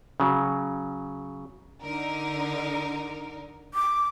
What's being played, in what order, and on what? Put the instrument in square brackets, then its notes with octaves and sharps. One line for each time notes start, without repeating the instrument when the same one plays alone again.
[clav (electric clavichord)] C#3 F#3
[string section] D3 D#4 A#4
[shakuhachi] D6